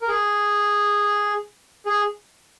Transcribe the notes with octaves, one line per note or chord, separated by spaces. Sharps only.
A#4
G#4
G#4